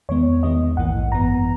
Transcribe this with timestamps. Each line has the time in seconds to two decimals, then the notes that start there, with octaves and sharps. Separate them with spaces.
0.09 E2 D#3 G#3 B3 C#5
0.43 E2 D#3 G#3 B3 D#5
0.77 A#1 G#2 E3 A#3 F#5
1.12 G#1 F#2 E3 B3 A#5